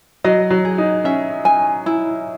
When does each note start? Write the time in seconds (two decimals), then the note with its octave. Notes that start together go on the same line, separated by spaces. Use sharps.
0.24 F#3 D#5
0.50 F#3
0.65 G#4
0.78 D#4
1.04 C#4 E5
1.45 G#5
1.86 E4